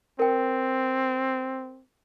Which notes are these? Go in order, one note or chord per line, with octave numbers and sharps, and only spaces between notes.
C4 A#4 G5